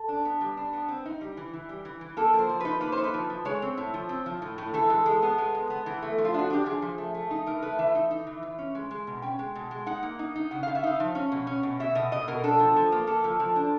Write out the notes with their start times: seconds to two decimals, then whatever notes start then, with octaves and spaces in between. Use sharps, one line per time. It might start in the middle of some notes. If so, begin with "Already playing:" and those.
Already playing: A4
0.09 D4
0.25 B3
0.41 G3
0.57 D4
0.73 B3
0.88 C4
1.06 D#4
1.21 G3
1.37 E3
1.53 E3
1.69 G3
1.85 E3
2.01 E3
2.17 A#3 A4
2.33 F3
2.39 C5
2.49 F3
2.60 D#4 B4
2.81 A#3 B4
2.92 C5
2.97 D#4
3.04 B4
3.14 F3
3.30 F3
3.45 G#3 C#5
3.62 C4
3.78 A2
3.94 F3
4.09 C4
4.26 F3
4.42 A2
4.58 A2
4.74 E3 A4
4.90 G#3
5.06 G#3
5.22 B3
5.38 G#3
5.55 G#3
5.70 B3
5.86 E3
6.02 A3
6.18 F3
6.25 F4
6.34 D4 F#4
6.50 D4 G4
6.66 F3 G#4
6.82 F3
6.98 A3
7.14 A3
7.31 D#4
7.46 E3 A#4
7.62 A3 B4
7.79 E3 E5
7.95 D#4
8.11 D#4
8.27 E3
8.43 E3
8.58 C#4
8.75 G#3
8.91 G#3
9.07 B2
9.22 C#4 G5
9.39 G#3
9.55 B2
9.71 G#3
9.86 D#4 F#5
10.03 A#3
10.19 D#4
10.36 D#4
10.51 C#3 F#5
10.63 C#3 F5
10.75 E5
10.83 D#4 F5
11.00 F3
11.15 C#4
11.32 B2
11.47 C#4
11.63 B2
11.80 B2 E5
11.95 B2 D#5
12.12 B2 D#5
12.28 B2 A#4
12.43 D4 A4
12.59 F3
12.76 F3
12.92 A#3
13.07 A#3 A4
13.24 F3
13.40 F3
13.56 D4